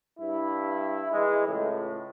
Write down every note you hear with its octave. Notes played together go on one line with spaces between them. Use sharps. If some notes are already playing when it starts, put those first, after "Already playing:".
G2 E4
E3 G#3
C#2 A2